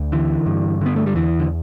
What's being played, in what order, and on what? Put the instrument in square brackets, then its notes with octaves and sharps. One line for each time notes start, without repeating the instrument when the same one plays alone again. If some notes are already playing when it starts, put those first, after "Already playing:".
Already playing: [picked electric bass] D2
D3 E3
G2
D3 B3
A3
G3
E2 E3
D3